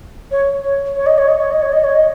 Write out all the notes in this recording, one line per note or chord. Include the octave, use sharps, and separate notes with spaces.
C#5
C#5
C#5
D#5
C#5
D#5
C#5
D#5
C#5
D#5
C#5
D#5